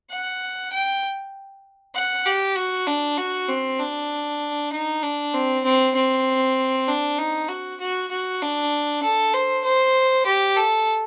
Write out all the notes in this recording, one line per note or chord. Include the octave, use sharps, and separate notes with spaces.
F#5
G5
F#5
G4
F#4
D4
F#4
C4
D4
D#4
D4
C4
C4
C4
D4
D#4
F#4
F#4
F#4
D4
A4
C5
C5
G4
A4